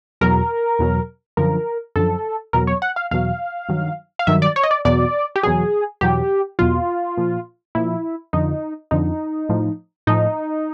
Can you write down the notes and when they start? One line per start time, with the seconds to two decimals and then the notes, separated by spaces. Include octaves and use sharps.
0.21 E2 B2 F#3 A#4
0.79 E2 B2 F#3
1.37 F#2 D3 F3 A#4
1.96 F#2 D3 F3 A4
2.53 E2 B2 F#3 A#4
2.67 C#5
2.82 F#5
2.96 F5
3.11 E2 B2 F#3 F5
3.69 G2 D#3 F#3
4.19 F5
4.27 G2 D#3 F#3 E5
4.42 D5
4.56 C#5
4.63 D#5
4.71 D5
4.85 E2 B2 F#3 D5
5.36 G4
5.43 E2 B2 F#3 G#4
6.01 E2 B2 F#3 G4
6.59 E2 B2 F#3 F4
7.17 A#2 F3
7.75 A#2 F3 E4
8.33 F2 D3 F3 D#4
8.91 F2 D3 F3 D#4
9.49 A2 F3
10.07 A2 F3 D#4